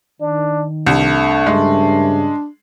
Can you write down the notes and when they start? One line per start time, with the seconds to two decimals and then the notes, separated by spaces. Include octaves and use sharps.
0.21 D#3 D4
0.86 C2 A3 D4
1.47 G2 C#3 G#3